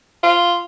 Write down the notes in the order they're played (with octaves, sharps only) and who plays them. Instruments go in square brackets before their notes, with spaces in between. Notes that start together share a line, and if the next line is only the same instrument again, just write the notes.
[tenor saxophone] F4